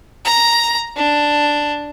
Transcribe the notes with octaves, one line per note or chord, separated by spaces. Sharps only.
A#5
D4